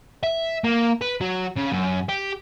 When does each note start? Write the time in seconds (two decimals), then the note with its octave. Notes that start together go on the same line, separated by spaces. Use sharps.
0.23 E5
0.64 A#3
1.02 B4
1.21 F#3
1.56 C#3
1.72 F#2
2.09 G4